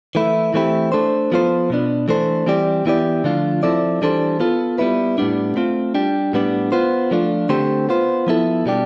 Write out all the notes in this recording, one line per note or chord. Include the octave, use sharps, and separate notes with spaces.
E3 A3 E4
E3 A3 C4 E4 G4
A3 D4 A4 C5
F3 B3 F4 A4 C5
B2 B3 D4
E3 A3 D4 A4 C5
E3 G3 C4 G4 D5
E3 B3 E4 G4 D5
D3 F3 A3 D4 F4
F3 C4 E4 A4 D5
E3 G3 D4 A4 C5
B3 F4 A4
G3 B3 E4 B4
A2 G3 B3 D4
A3 C4 F4
G3 D4 G4
A2 G3 B3 D4
B3 F4 C5
F3 A3 D4 F4
D3 A3 C4 G4 C5
B3 F4 C5
F3 B3 E4 A4
B2 G3 D4 G4